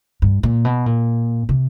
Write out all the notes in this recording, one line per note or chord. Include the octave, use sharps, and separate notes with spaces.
G2
A#2
B2
A#2
C3